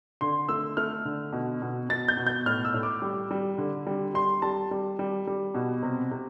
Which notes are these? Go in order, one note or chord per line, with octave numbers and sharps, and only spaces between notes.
D3 C6
A3 E6
A3 F6
D3
B2
B2
B2 A6
G6
B2
G6
A2 F6
E6
A2
D6
G3
G3
D3
G3
G3 C6
G3 A5
G3
G3
G3
B2
C3
C3